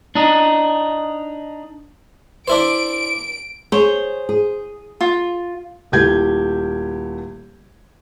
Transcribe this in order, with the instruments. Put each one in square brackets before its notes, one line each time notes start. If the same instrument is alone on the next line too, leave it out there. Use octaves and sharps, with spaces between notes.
[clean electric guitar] D4 D#4
[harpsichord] D4 E4 C5 [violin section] D7
[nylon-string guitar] G#4 C#5 [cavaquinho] C5
[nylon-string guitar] G#4
[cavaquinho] F4
[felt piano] D#1 A3 E4 G4 G6 G#6